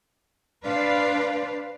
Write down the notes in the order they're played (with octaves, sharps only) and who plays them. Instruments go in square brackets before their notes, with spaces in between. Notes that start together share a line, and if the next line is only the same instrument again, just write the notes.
[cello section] D4 B4 C5 D5 F5